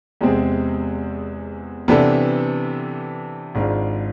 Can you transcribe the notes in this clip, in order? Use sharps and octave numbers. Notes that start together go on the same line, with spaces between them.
E2 C3 G#3 C4 G#4
C3 E3 B3 D4 A4
G#1 G#2 G#3 D4 F4